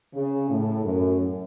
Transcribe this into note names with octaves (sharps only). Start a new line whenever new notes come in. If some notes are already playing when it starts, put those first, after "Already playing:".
C#3
A2
F#2